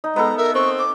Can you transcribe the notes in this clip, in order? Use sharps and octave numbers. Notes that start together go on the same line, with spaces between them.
D#4
G#3 B3 A4 A#5
A#4 E5
C4 C#6
D6